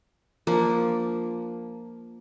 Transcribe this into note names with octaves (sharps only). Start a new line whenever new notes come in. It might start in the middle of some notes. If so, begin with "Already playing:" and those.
F3 A#3 D4